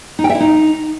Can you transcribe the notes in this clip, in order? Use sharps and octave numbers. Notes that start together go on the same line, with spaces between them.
D#4
G5
E5
E4
D#4